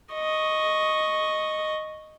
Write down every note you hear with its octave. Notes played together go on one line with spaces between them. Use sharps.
D#5 C#6